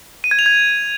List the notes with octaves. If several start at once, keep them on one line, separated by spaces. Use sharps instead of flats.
D#7
G#6
F7
G#6